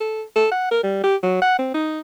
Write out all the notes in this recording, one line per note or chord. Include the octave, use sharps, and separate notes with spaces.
A4
A4
F#5
A#4
G3
G4
F#3
F#5
C4
D#4